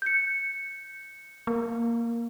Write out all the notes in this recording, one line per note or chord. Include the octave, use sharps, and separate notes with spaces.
G6 C#7
A#3